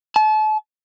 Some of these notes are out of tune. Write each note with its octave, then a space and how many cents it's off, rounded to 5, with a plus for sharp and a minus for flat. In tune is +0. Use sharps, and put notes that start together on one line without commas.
A5 -35